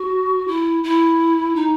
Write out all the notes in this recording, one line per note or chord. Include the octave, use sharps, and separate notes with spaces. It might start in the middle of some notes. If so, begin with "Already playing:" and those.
Already playing: F#4
E4
E4
D#4